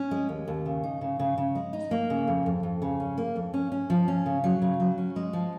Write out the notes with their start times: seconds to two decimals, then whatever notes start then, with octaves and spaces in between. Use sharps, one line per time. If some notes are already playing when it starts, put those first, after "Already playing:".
Already playing: C#4
0.11 G#3
0.29 D#2
0.48 D#2
0.66 C#3
0.83 D#4
1.01 C#3
1.19 C#3
1.38 C#3
1.55 G#3
1.73 D#4
1.91 A#3
2.10 C#3
2.28 F2
2.46 F2
2.63 F2
2.82 C#3
3.00 C#4
3.18 A#3
3.36 F2
3.54 C#4
3.72 C#4
3.90 F3
4.08 C#4
4.26 C#3
4.44 F#3
4.62 C#3
4.80 F#3
4.98 C#4
5.16 G#3
5.33 F3